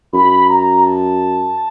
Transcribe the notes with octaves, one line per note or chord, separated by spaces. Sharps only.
F#2 B5
A#5
A5